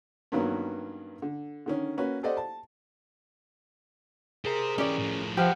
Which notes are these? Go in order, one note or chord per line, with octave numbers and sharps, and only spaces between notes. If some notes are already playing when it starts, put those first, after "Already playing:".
G2 D#3 F#3 A#3 B3 C#4
D3
D3 D#3 C#4
A#3 C#4 F#4 B4
G4 A4 C5 D5 D#5 F#5
A5
G4 G#4 A#4 C5 A#5
E3 C#4 G4 D5
A2 F3
F3 G#3 G4 B4 F#5 F6 G6